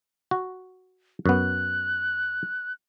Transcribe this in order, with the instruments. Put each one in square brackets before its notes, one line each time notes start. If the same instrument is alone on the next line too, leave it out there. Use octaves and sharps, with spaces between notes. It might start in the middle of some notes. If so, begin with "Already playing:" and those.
[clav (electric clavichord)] F#4
[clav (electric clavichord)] F#2 B3 [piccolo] F#6